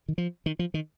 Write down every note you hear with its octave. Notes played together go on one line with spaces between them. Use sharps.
D#3
F3
D#3
F3
D#3